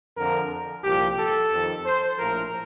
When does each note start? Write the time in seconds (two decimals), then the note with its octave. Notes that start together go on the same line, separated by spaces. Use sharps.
0.18 F2 D3 F3 A#4
0.84 C2 A#2 F3 G4
1.18 A4
1.52 F2 D#3
1.85 C5
2.19 A#1 A2 F3 A#4